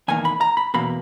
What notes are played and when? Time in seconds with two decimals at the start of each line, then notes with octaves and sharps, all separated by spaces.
0.08 E2 D#3 A#3 G#5
0.25 B5
0.41 A#5
0.57 B5
0.74 E2 B2 A#3 B5